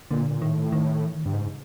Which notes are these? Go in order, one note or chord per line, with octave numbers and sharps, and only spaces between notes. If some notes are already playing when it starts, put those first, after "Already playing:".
A#2 D3
A#2
A2 D#3
D#3
E3
D#3
G2 D3
G#2 C#3